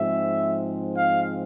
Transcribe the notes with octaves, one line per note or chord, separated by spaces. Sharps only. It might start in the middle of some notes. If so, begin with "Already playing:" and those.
Already playing: G#2 F3 G#3 C4 E5
F5